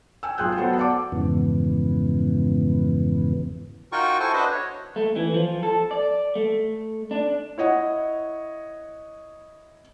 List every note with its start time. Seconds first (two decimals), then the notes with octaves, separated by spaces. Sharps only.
0.23 G5 G#5 E6
0.38 B1 F4 G#4 G5 F#6 G6
0.57 F#3 B3 A4 C5 F#5
0.78 D5 F#5 A5 D6
1.12 F2 G#2 C#3 E3 B3
3.92 D#4 F4 F#4 A#4 G5 C#6
4.20 E4 A4 C5 G#5 C#6
4.33 D4 F#4 B4 C5 D#5
4.52 C#5
4.96 A3
5.16 E3
5.34 F3
5.63 A4
5.91 D5
6.36 A3
7.11 D4
7.58 E4 C#5 D#5 F#5